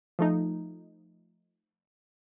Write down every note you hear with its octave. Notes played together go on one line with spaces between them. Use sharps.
F3 A3 D#4